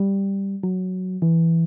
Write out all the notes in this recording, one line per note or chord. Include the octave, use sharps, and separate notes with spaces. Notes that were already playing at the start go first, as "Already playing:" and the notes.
Already playing: G3
F#3
E3